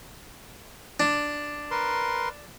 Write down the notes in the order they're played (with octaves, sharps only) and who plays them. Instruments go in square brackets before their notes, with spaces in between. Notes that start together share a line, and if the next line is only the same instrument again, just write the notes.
[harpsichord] D4
[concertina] A#4 B4 C6